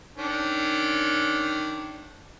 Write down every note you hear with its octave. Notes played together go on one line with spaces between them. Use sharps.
D#3 C#4 D4